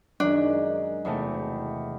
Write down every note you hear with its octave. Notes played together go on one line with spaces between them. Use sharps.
F#2 D#3 G#3 C#4 D4
E2 C3 E3 A3